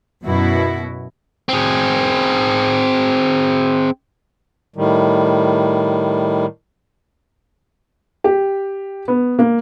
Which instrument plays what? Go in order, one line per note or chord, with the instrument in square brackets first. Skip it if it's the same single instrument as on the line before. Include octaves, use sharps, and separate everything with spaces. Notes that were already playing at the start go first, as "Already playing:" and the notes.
[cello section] F#2 B2 E4 F#4
[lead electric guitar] C4 G#4
[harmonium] A2 D#3 G3
[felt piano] G4
B3
A#3